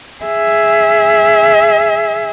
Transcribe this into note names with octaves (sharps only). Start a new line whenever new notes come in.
G#4 E5